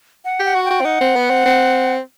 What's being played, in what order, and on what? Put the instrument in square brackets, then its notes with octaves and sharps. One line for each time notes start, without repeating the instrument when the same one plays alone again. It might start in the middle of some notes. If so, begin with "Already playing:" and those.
[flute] F#5
[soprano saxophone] G4
[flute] F#5
[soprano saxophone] F#4
[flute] G5
[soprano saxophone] F#4
C4
[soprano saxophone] D#4 [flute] F#5
[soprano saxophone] C4
B3
C4
C4